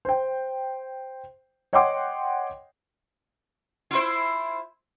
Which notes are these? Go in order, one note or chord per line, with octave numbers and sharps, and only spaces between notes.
C5 G5
C#5 D#5 F#5 G5 C6 D6
E4 F4 C5